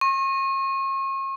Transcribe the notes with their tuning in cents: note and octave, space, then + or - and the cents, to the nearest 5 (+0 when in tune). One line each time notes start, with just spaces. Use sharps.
C#6 -40